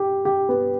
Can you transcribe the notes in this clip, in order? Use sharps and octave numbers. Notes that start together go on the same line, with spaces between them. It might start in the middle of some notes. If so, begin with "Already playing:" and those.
Already playing: G4
G4
B3